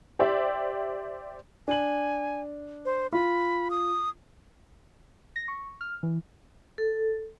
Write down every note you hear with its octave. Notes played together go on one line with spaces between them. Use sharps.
G4 C5 D5 E5 G5
D4 G#5 F#7
C5
F4 B5
D#6
A#6
C#6
F6
E3
A4